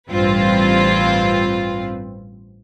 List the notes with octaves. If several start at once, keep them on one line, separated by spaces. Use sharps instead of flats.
A1 G2 C4 F4 B4